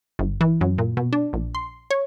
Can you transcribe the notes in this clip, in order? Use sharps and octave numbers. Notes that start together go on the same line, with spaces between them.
G1
E3
F#2
A#2
B2
D4
A#1
C6
C#5